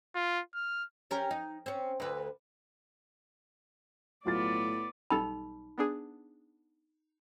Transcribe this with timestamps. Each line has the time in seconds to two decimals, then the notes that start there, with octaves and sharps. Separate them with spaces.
0.15 F4
0.54 F6
1.11 C#4 G4 A#4
1.31 D#4
1.66 C4 C#4
2.00 D2 B4
4.26 B1 A2 B3 F4 D5 A6
5.10 B1 G3 D#4 A4 B5
5.78 B3 D4 G#4